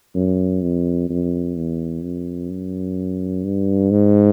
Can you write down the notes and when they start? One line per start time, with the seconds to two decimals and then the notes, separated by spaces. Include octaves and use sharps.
0.15 F#2
0.62 F2
1.09 F2
1.56 E2
2.03 F2
2.50 F#2
3.44 G2
3.91 G#2